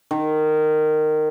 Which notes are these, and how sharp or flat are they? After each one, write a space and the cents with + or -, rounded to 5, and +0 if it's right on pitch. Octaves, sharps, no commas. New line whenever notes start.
D#3 -15